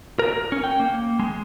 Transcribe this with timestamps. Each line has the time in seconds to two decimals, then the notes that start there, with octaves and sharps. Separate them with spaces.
0.19 A#4
0.52 C#4
0.64 G5
0.80 A#3
1.20 G#3